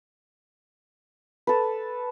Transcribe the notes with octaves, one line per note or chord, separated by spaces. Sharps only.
A4 B4